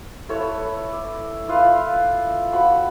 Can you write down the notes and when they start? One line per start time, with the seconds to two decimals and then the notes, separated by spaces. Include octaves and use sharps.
0.29 E4 A4 B4 C#5
0.93 D5
1.48 E4 F4 B4 F5
2.52 F3 F#4 B5